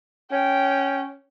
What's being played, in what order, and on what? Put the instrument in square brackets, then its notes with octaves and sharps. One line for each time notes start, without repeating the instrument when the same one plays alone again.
[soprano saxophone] C#4 [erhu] G5